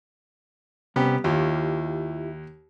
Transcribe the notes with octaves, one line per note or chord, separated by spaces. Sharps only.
C3 G3 B3 C#4 G4 A#5
D#2 E4 F4 G4